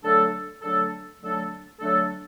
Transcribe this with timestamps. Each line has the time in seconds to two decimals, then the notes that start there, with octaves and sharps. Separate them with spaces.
0.02 D3 F#3 A3 D4 A4
0.62 D3 F#3 A3 D4 A4
1.21 D3 F#3 A3 D4 A4
1.79 D3 F#3 A3 D4 A4